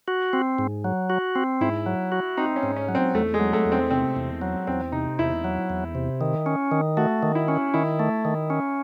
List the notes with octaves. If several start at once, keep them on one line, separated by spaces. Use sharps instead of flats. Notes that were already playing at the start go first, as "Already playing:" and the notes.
F#4
C4
G#2
F#3
F#4
C4
G#2 E4
F#3
F#4
C4 D#4
C#4
G#2
C#4
F#3
C4
E2 A3
G#3
F#3
A3
E2
C4
C3 C4
E2
F#3
E2 C4
C3 D#4
E2 E4
F#3
E2
C3
D#3
C#4
D#3
A3 F#4
D#3
E4
C#4
D#3 E4
A3
D#3
C#4